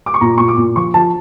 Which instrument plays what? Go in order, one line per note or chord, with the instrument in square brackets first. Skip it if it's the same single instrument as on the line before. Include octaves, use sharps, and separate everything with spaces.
[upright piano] D6
C#6
A#2 A#5
A#2 C#6
D6
A#2
F3 C#6
F3 A5